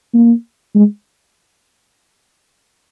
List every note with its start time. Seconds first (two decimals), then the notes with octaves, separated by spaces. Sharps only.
0.14 A#3
0.75 G#3